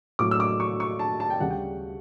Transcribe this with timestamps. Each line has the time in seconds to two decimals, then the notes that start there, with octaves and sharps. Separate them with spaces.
0.19 A2 F#3 A3 D6
0.31 E6
0.40 D6
0.60 C#6
0.80 C#6
0.99 A5
1.20 A5
1.30 G5
1.40 D2 C#3 G3 F#5
1.50 G5